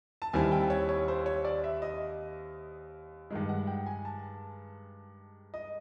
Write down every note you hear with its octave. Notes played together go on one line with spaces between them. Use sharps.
A5
D#2 D#3 G3 C4 E4 G#5
G5
C#5
C#5
C5
C#5
D5
E5
D#5
G2 D#3 G#3 D#5
F#5
G5
G#5
A5
D#5